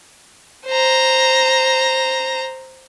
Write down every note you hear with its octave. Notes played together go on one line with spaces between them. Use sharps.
C5 A#5